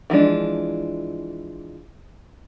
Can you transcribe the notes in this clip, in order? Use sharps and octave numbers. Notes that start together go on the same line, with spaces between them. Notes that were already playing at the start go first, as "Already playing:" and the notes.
E3 F3 G#3 D4